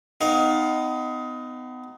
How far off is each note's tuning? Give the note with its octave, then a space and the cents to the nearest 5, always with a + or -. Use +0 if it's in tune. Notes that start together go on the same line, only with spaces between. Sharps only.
B3 +35 D#4 +0 F5 +25